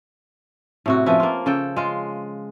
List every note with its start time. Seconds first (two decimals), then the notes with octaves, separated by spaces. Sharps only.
0.86 A2 C3 F#4
1.06 F3 B3 C#4 E4
1.20 A#3 F4
1.46 C#3 A4 G5
1.76 G#3 F4